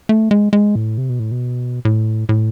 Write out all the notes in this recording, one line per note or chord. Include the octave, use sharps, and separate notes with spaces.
A3
G#3
G#3
A2
C3
B2
A2
B2
A2
A2